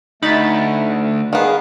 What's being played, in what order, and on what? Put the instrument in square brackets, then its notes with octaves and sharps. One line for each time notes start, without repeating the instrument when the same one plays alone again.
[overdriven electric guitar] D2 [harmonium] A3 [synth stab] D#4 B5 A6
[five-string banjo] D#3 B3 [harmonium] G#4 F5